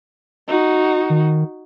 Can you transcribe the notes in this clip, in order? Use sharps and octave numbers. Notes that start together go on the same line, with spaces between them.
D#4 F#4
D#3